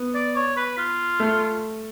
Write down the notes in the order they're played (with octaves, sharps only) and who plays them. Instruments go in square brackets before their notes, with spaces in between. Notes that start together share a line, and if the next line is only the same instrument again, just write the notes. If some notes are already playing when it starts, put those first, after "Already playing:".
Already playing: [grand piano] B3
[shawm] D5
C#5
B4
F4
[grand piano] A3